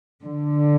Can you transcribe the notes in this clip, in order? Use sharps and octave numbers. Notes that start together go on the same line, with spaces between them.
D3